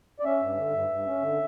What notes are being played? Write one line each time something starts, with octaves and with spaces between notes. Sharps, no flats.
D5
C#4 E5
G2
D3
G2
G2
C#4
D3